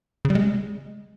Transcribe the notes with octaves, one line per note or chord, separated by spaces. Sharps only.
C#3
G3
G#3